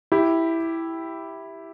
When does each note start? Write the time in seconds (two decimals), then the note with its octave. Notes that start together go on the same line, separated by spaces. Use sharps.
0.12 E4 G4